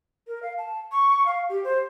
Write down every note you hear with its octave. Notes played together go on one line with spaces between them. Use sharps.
A#4
F5
A5
C#6
F5
G4
C5